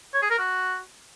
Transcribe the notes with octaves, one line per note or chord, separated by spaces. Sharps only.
C#5
G#4
A#4
F#4